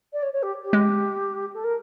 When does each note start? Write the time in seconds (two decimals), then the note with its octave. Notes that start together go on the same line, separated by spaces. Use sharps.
0.13 D5
0.23 C#5
0.33 C#5
0.43 G4
0.64 G4
0.73 G#3
1.54 A4
1.64 A#4